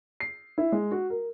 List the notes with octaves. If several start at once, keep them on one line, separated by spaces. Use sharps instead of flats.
C7
E4
G#3
F#4
A#4